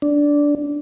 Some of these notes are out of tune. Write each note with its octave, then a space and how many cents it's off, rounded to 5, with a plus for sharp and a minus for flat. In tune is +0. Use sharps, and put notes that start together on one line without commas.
D4 -10